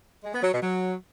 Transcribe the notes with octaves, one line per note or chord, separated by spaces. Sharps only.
G#3
B3
F#3
B2
F#3